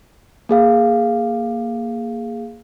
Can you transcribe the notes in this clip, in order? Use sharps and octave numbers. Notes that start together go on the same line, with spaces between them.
A#3 G#4 F5